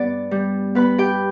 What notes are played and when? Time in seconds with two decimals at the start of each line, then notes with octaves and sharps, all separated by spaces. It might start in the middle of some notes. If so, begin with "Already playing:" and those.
Already playing: G2 B3 D5 D6
0.31 G3
0.75 B3 B4 B5
0.98 G4 G5